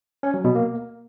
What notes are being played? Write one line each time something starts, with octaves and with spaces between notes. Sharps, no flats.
C#4
F#3
B2
A#3